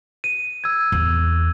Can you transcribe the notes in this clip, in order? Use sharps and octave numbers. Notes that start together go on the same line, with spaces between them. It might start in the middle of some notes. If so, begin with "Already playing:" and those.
D#7
E6 G#6
E2